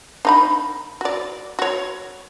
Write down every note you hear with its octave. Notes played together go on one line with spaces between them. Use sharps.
D4 D#4 B5
F#4 D5
F#4 C#5